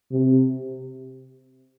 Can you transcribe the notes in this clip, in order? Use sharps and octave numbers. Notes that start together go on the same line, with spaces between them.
C3